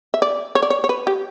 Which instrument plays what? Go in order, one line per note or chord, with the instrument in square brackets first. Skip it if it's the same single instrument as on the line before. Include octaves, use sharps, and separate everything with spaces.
[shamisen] E5
D5
C#5
D5
C#5
C#5
B4
G4